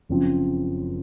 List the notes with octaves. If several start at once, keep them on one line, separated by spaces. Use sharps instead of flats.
F#1 F#2 F3 C4